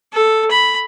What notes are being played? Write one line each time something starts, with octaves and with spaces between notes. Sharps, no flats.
A4
B5